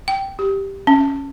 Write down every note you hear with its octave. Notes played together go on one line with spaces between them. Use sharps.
G5
G4
C#4